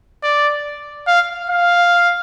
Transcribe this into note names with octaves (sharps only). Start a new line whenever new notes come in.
D5
F5
F5